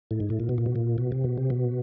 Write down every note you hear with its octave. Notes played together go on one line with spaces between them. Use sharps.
A2
G#2
A2
A#2
B2
A#2
B2
A#2
B2
C3
B2
C3
B2